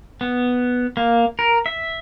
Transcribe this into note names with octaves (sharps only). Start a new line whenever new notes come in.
B3
A#3
A#4
E5